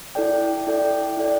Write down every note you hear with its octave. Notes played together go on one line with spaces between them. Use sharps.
E4 A4 D5 G5
E4 A4 D5 G5
E4 A4 D5 G5